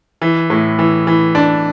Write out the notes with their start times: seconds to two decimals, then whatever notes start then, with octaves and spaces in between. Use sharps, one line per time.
0.22 E3
0.50 A2
0.79 E3
1.07 E3
1.35 D4